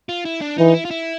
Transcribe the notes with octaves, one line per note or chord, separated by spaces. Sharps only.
F4
E4
D4
E3 D#4
E4
F4
E4